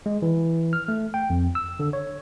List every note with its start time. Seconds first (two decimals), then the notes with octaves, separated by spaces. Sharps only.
0.06 G#3
0.22 E3
0.73 F6
0.88 A3
1.14 G5
1.30 F2
1.55 E6
1.80 D3
1.93 C#5